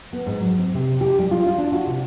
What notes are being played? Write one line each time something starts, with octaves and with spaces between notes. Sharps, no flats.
B3
G#2
F#3
C4
C3
G4
G3
F4
F4
D4
F#4
C3